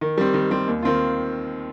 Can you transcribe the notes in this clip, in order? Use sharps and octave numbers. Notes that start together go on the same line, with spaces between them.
D#3
G3 C4
D#3
G3 C4
D#2
D#3 C4 F4